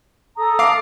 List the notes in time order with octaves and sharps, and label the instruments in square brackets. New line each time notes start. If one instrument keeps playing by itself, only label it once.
[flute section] A4 A#5 D#6
[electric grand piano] F5 D6 C7